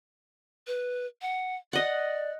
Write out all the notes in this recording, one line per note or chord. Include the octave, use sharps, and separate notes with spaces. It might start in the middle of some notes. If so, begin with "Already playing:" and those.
B4
F#5
D5 D#5 F#5